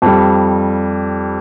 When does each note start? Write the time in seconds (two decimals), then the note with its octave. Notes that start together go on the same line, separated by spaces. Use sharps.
0.02 F2 G3